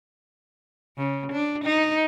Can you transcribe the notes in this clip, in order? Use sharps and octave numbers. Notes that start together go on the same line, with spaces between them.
C#3
D4
D#4